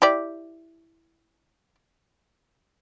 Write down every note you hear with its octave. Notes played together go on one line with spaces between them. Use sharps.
E4 G4 D5